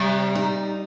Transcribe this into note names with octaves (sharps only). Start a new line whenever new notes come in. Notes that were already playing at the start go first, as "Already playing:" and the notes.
Already playing: C3 G3
D#4